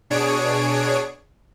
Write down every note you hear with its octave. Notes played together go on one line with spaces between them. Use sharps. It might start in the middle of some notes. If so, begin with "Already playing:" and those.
B2 D4 G#4 C#5 D7